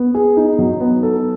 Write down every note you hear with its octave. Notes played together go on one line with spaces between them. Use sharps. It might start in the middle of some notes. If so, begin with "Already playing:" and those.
Already playing: B3
G#4
D#4
F#3
B3
A4